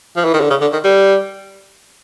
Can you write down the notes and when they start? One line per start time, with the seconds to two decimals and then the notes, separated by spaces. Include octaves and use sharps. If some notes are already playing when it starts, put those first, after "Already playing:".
0.17 F3
0.25 E3
0.34 D#3
0.41 D3
0.50 C#3
0.61 D3
0.73 D#3
0.84 G3